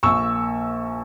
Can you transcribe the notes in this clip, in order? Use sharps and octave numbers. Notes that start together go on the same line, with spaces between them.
A#1 A#2 C#6 E6